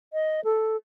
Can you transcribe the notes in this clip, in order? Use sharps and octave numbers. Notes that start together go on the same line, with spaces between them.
D#5
A4